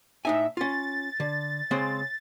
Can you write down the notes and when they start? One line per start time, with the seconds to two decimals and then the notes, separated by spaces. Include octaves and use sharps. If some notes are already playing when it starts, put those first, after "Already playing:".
0.25 A2 D#4 E5 G#5
0.57 C#4 F4 A6
1.20 D3
1.71 C#3 G#3 C4